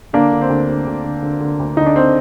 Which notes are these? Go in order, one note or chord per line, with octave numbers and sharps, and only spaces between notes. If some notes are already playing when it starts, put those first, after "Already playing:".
D3 A#3 D4
D3
C4
D2
D2
D2
D3
D3
D3
D2
D3 D#4
D4
C4